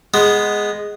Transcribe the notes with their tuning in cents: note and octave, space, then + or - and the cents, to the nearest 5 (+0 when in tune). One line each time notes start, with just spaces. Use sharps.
G#3 +0 B3 +0